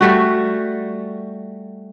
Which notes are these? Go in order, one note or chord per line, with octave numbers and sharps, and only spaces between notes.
G3 A3 F#4